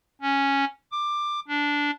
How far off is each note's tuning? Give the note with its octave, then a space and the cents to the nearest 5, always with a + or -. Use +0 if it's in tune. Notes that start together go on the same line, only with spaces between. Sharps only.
C#4 -5
D6 +15
D4 -10